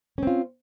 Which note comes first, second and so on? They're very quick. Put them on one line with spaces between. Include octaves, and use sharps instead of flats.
C#4 C4 F4